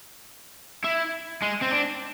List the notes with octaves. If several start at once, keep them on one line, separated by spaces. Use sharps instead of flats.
E4
G#3
C4
D4